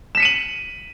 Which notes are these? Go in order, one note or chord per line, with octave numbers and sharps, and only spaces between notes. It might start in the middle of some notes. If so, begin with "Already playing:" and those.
B6 C#7 D#7 E7 F#7